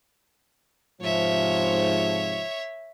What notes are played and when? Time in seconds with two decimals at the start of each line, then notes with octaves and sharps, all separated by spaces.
1.01 G#2 C3 F3 C#5 E5